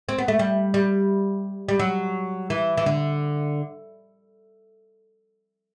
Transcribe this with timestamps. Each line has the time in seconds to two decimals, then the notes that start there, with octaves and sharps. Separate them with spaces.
0.09 C4
0.18 B3
0.28 A3
0.39 G3
0.74 G3
1.69 G3
1.79 F#3
2.50 E3
2.77 E3
2.86 D3